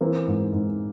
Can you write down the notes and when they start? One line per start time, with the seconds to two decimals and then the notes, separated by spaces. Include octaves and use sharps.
0.01 E3 A#3 C4
0.27 G#2
0.53 G#2